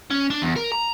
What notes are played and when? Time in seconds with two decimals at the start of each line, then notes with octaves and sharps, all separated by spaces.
0.10 C#4
0.30 D4
0.42 E2
0.56 A#4
0.72 A#5